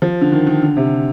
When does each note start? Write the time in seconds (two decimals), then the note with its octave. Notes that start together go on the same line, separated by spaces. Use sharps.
0.02 F3
0.21 D3
0.32 D#3
0.47 D#3
0.62 D3
0.77 C3